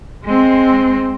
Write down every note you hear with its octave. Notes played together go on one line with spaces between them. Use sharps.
G#3 C4